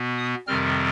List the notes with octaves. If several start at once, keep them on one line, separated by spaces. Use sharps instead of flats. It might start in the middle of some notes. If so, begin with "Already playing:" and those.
Already playing: B2 B3
D#6
F2 C3 D#3 G3 C4 F6